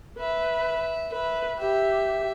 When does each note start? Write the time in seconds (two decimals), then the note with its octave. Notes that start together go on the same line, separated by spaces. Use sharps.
0.19 B4 E5
1.12 B4 E5
1.59 G4 E5